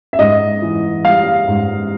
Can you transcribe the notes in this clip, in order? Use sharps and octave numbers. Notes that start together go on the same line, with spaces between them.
E5
G#2 D#5
E3
G3 F5
G#2